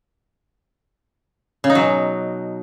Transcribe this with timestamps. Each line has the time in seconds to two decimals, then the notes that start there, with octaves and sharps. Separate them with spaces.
1.64 C#3
1.70 D#4
1.75 F#3
1.81 B2